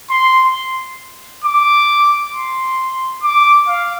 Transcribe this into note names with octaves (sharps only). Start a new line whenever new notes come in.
C6
D6
C6
D6
F5